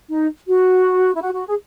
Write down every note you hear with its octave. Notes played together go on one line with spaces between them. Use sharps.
D#4
F#4
E4
F#4
F#4
G#4